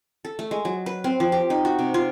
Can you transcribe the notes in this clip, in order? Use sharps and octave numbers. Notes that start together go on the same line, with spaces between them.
A4
A3
G#3
F#3
B4
C4
F3
G4
D#4
F#4
C3
F4